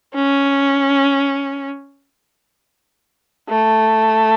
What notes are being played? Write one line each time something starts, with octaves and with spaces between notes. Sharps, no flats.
C#4
A3